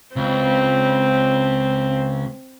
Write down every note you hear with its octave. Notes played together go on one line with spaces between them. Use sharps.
C#2 C4